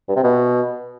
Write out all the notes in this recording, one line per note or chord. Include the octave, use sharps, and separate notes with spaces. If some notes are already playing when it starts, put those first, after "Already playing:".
G2
C3
B2